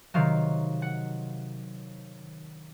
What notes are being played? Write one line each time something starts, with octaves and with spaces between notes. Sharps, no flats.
C3 D#3 F#3 F5
F#5